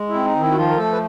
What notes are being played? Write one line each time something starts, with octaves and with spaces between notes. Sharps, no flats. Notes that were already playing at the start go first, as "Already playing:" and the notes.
Already playing: G#3
E4
C4
D#4
D#3 E4
F#4
F3 F4
A#4
A3 A4
B4